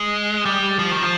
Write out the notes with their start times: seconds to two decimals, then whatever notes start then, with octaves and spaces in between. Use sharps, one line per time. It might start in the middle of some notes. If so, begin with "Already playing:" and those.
Already playing: G#3
0.45 G3
0.79 F3
0.91 D#3
1.03 F3